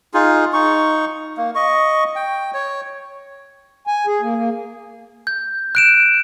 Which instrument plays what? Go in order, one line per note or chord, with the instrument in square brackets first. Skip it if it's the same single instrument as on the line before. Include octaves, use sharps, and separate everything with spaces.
[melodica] D#4 F4 G#4
D#4 C#6
A#3
D#5 C#6
G5
C#5
[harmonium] G#5
G#4
A#3
A#3
[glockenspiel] G6
F#6 D7 E7